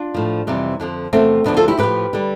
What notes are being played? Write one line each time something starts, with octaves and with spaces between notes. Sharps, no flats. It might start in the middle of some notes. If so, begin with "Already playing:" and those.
Already playing: D4 F4
A2 F3
F2 C3 E3 G3
F2 D3 F3
E2 C3 F3 A3 C4
D2 D3 F3 B3 D4
F4 A4
E4 G4
A2 F3 G4 B4
D3 G3